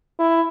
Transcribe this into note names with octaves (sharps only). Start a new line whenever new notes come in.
E4